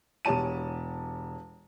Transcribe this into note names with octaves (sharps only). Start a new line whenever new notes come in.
E1 B3 G4 C#5 A5 D#7